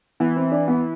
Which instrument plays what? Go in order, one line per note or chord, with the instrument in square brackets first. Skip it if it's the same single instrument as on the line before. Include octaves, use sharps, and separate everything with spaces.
[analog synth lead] E3 [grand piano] B3
[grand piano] C4
D4
B3